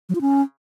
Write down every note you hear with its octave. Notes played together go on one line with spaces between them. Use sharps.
F#3
F4
C#4